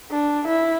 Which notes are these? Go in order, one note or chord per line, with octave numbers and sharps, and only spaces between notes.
D4
E4